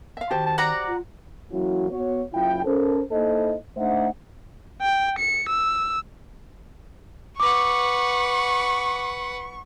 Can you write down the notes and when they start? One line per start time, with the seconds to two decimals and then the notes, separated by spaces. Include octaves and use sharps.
0.17 E5 F5
0.30 D#3 F#4 G4 C5 A5
0.46 A5
0.58 D5 F#5 A#5
0.88 F4
1.52 E3 F#3 A#3 C#4 E4 F#4
1.91 B3 F#4 C#5
2.33 F#1 E4 F4 G5
2.64 C#4 A4 A#4 C5
3.11 A#3 D#4 E4 A4 C5 D#5
3.77 A3 D4 D#4 C5 E5 F#5
4.82 G5
5.19 C#7
5.49 E6
7.40 B4 F#5 C#6 D6